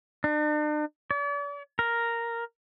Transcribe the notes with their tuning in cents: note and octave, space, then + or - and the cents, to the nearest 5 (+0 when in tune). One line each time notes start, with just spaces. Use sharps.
D4 +45
D5 -45
A#4 +0